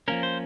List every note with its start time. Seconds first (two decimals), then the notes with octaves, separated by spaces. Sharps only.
0.08 F3 A#3 C#4 A#4
0.23 C5